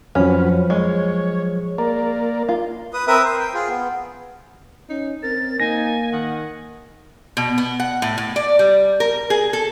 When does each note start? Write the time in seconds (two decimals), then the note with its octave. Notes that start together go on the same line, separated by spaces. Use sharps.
0.15 F2 F3 F#3 C#4 F#4 B4 F6
0.70 G#3 C#5
1.78 A#3 A#4 D5 A#5
2.49 F4
2.93 B4 D#6
3.07 C4 A#4 B4 E5 D#6
3.25 C5
3.40 G5
3.54 F4 G#4
3.68 B3
4.89 C#4 D#4
5.23 C4 A#4 A6
5.60 A#3 D#4 G#5 A#6
6.12 D#3 F#5
7.37 B2
7.58 B3
7.80 F#5
8.02 A2
8.18 A2
8.36 D5
8.59 G3
9.00 A#4
9.30 G#4
9.53 A4